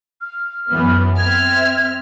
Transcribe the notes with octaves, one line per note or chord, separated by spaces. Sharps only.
F6
F#2 E3 B3
C4 E5 F6 G#6